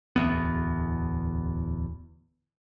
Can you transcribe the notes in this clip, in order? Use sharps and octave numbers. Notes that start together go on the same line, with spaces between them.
D1 E2 B3